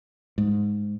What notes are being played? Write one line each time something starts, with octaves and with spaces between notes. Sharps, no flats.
G#2